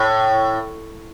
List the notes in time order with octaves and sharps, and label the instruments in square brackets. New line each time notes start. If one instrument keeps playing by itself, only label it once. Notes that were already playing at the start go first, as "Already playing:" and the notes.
Already playing: [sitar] A2